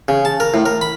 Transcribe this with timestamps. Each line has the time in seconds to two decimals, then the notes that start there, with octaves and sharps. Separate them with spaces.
0.08 C#3
0.25 A5
0.40 A#4
0.54 A2
0.66 A#4
0.81 B5